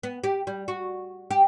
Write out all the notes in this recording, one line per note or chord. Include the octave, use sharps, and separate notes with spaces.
B3
G4
G3
F#4
G4